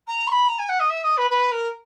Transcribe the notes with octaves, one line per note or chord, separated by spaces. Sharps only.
A#5
C#6
B5
A#5
G#5
F#5
D#5
E5
D#5
B4
B4
A#4